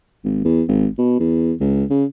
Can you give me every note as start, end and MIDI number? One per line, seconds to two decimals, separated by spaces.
0.24 0.45 32
0.45 0.63 40
0.68 0.87 32
0.98 1.16 47
1.20 1.53 40
1.61 1.85 37
1.90 2.05 49